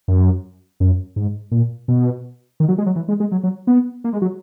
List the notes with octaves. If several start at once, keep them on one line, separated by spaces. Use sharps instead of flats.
F#2
F#2
G#2
A#2
B2
D#3
F#3
G#3
F#3
E3
G#3
G#3
F#3
F#3
B3
A#3
G#3
F#3